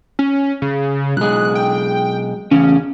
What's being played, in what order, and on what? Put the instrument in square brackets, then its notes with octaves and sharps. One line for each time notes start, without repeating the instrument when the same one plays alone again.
[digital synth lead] C#4
C#3
[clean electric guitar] B1 G#3 [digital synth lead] F#6
[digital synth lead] G5
[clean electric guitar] E2 C#3 [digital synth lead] C#4